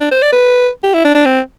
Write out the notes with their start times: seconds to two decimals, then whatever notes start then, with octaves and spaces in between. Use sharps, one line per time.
0.01 D4
0.12 C5
0.22 D5
0.33 B4
0.84 G4
0.94 E4
1.05 D4
1.15 D4
1.26 C4